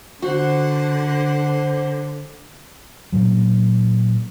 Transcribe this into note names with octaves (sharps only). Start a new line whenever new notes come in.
D3 F#4 C5 F#5
A#2 F#3